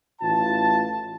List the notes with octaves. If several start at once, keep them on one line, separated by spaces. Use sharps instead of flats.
A1 F4 A5